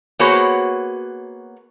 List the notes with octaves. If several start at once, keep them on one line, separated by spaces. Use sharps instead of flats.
A#3 B3 F#4 G#4 C5 C#5